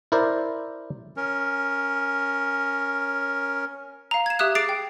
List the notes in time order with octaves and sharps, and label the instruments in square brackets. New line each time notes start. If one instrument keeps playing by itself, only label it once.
[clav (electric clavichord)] E4 A#4 C5 D5
[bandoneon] C#4 A#4
[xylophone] F5 A#5
G#6 E7
G4 E5 D#6 F#6
G#4 D6 A6 C7 D7
G5